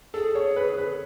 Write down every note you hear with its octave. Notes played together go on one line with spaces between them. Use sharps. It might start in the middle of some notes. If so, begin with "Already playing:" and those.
G#4 A4
C#5
B4
B4